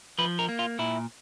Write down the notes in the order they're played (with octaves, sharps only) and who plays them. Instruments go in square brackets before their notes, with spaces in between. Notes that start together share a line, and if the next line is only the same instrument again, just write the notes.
[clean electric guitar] F3 B4
A#4
A#3
F4
A#2 E4